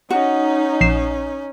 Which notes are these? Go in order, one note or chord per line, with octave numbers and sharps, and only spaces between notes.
C#4 D#4 F#4
A#1 C7 E7